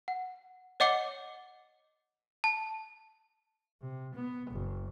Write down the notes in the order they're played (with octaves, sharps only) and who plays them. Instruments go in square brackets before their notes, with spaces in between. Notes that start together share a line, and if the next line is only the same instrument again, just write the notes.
[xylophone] F#5
C#5 D#5 F#5 D6 C#7 G7
A5
[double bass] C3
B3
F#1